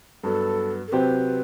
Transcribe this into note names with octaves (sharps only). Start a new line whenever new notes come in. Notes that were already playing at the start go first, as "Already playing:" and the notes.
G2 F#3 B3 A4
A4
C3 F#3 C4 G4 B4 C5